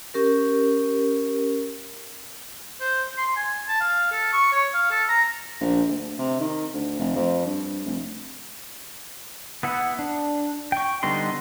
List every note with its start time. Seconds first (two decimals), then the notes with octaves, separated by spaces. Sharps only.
0.14 C#4 G4 A#4
2.81 C5
3.17 C6
3.36 G#5
3.68 A5
3.80 F5
4.12 A4
4.33 C#6
4.52 C#5
4.74 F5
4.90 A4
5.09 A#5
5.60 A#1
5.88 D2
6.18 C3
6.40 D#3
6.74 D2
6.99 F1
7.15 F2
7.46 G2
7.86 F1
9.63 B3 E4 F#5
9.99 D4
10.72 G5 C#6
11.03 D3 G3 B3 D#4 C6